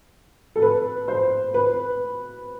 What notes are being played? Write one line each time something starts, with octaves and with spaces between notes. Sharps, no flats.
A4
B4
C5
B4